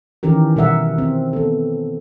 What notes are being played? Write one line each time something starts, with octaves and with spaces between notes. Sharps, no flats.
D#3 E3 C#4 G4 A#4
B2 G3 A#4 E5 F#5
C4
B3 A4